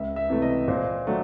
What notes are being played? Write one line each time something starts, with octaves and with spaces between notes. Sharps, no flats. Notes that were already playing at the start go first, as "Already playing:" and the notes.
Already playing: C#2 E5
E5
C3 E3 A3
D#5
A#2 C5
F#3 A3 D4